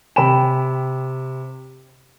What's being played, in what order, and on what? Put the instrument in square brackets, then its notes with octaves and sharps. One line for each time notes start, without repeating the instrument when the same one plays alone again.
[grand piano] C3 B5 E7 [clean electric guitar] G5